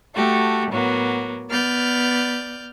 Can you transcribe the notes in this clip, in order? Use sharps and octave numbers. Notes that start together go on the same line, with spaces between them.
A3 F#4 G4 A4
A2 F#3 A#3 B3
B3 D5 F6 G6